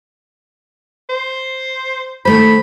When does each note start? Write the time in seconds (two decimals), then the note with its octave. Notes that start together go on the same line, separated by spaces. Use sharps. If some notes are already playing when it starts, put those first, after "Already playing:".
1.09 C5
2.25 D#3 A3 C5 B5